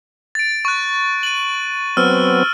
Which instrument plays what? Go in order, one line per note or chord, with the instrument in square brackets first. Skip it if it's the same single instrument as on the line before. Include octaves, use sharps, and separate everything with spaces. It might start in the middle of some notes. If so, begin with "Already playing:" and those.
[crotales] A6 D7
C#6 F#6
D#7 F#7
[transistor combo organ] F#3 B3 C4 [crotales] E6 F6